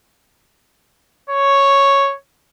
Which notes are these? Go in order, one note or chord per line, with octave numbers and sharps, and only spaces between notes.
C#5